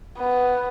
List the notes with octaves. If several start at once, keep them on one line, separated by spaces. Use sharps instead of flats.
B3